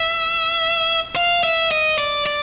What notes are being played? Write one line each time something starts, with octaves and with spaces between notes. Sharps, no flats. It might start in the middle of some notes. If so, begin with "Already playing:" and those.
Already playing: E5
F5
E5
D#5
D5
D5